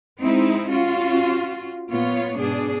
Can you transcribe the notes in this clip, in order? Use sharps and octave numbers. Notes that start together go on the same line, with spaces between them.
G#3 C4 D#4 E4
C#4 F4 F#4
A#2 B3 F4 C#5
G#2 B2 D4 G#4